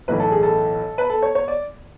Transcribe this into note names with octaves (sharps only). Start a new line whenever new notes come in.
B1 A2 E3 B4
A4
G#4
A4
B4
A4
C#5
C#5
D5